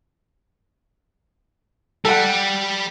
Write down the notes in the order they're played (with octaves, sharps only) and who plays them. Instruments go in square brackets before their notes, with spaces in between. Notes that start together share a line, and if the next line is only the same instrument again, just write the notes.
[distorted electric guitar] G3 [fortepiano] A4 F#5